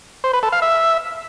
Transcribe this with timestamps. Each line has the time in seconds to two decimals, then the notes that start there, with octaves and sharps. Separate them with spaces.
0.24 C5
0.33 B4
0.43 A4
0.52 F5
0.62 E5